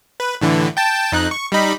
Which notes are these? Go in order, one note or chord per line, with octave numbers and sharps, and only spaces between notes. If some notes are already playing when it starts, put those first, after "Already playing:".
B4
A2 D3 E3
G5 A5
F2 D#4 F#6
C#6
G3 D#4 B5